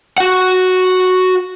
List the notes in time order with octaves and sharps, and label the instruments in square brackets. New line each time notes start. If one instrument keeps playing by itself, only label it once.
[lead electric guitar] F#4 F#5